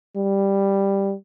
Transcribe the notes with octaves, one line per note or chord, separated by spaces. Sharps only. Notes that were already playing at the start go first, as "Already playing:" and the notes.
G3